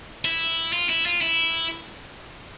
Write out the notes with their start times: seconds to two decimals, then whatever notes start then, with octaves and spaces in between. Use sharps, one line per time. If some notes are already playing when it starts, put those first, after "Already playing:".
0.25 E4
0.73 F4
0.89 E4
1.06 F4
1.21 E4